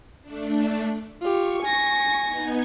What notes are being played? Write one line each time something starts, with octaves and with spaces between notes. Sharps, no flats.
A3 D4
F4 G4 C#6
G#5 A#6
B3 D#4 G#6